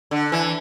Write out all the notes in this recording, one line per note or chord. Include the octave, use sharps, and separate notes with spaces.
D3
E3